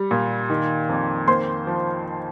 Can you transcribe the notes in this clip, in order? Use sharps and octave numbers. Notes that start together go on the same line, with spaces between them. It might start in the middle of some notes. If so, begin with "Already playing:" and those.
Already playing: G3
A#2
D#3
F2
A#3 C5 C6
F3